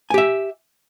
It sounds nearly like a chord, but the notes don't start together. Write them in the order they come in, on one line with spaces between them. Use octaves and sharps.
G#5 G4 E5